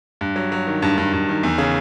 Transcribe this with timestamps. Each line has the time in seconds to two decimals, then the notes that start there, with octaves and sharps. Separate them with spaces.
0.21 G2
0.36 F#3
0.52 F#3
0.67 D#3
0.82 G2
0.98 G2
1.13 G2
1.29 D#3
1.43 E2
1.58 C#3